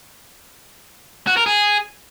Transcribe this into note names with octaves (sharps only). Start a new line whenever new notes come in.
F#4
A#4
G#4